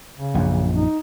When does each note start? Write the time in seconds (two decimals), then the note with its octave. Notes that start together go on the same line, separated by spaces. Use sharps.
0.17 C#3
0.34 A#1 F#2
0.76 D#4